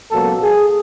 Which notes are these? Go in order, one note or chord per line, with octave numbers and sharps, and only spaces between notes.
C#2 B2 F#3 A#3 A4
G#4